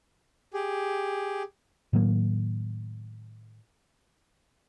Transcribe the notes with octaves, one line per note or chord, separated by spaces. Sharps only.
G4 G#4
A2 D#3 F#3 A#3